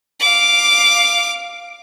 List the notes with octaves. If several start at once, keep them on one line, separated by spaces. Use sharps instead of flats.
F5 D6